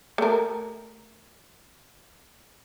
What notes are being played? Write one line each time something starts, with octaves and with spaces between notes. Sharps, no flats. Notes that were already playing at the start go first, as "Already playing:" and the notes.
A3 A#4